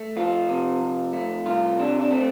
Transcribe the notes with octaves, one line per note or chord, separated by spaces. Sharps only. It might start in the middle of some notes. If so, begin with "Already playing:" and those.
Already playing: A3
F2 F4
C3
F2
A3
C2 F4
C3 D4
D4
A3 C4